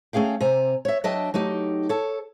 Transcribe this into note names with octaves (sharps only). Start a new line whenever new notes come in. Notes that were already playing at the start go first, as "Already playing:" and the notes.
A3 C#4 G#4 F5 G5
C3 G#5 A#5
C#5 E5
F#3 D4 D#5 E5 G5 A5
F#3 A3 D#4 G4
A4 C#5